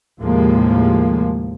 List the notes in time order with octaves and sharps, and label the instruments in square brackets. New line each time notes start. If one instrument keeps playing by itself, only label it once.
[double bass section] D#2 A2 C3 F3 G#3 A#3